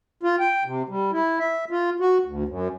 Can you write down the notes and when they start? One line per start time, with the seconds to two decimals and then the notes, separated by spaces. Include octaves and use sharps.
0.23 F4
0.40 G5
0.65 C3
0.89 G3
1.12 E4
1.39 E5
1.71 F4
2.00 F#4
2.25 D2
2.48 F#2